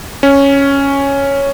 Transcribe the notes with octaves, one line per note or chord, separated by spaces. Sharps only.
C#4